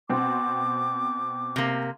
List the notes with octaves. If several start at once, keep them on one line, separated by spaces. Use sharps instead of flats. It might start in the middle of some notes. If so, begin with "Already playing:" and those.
B2 C4 D6
C3 A#3